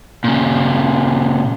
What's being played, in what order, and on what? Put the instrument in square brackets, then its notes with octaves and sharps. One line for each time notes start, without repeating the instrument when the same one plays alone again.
[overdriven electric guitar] A#2 C#3